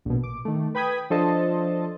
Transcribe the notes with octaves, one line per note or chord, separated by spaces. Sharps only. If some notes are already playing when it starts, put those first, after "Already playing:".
A#1 B2
D6
D#3 A3
B4 G5 B5 D#6 G#6 B6
F3 D4 A4 C5 D#5 A5